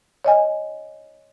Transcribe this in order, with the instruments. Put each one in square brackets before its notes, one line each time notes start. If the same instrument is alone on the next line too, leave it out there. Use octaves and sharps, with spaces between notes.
[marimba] C#5 D#5 G#5